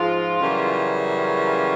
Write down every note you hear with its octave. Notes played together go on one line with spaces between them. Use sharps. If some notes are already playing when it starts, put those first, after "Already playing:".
Already playing: G#2 F3 G#3 F4
F#2 C#3 E3 G3 A#3
F4